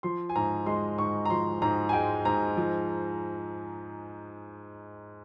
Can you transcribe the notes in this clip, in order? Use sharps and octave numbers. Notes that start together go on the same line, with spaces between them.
F3 C6
G#5
G#2 A#5
G#3 C6
G#2 C#6
A#5
F3 C6
G#2 A#5
G#5
G#3 G5
G#2 A#5
F3